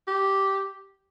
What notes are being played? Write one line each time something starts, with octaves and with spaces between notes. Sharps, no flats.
G4